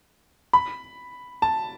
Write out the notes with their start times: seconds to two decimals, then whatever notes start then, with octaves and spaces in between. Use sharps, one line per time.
0.53 B5
1.42 A5